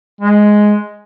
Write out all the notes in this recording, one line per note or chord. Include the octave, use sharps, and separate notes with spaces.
G#3